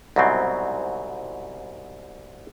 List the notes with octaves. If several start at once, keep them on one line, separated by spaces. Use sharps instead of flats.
C2 G#2 B2 F#3 C4